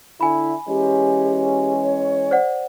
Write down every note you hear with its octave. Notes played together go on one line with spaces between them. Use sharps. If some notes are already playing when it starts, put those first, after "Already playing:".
D3 E4 G#5 B5
E3 G#3 C#4 G4
C#5
C5 D5 F#5